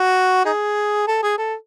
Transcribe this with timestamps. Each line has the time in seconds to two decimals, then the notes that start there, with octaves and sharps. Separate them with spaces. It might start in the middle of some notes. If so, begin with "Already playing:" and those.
Already playing: F#4
0.45 D#4 G#4
1.07 A4
1.22 G#4
1.38 A4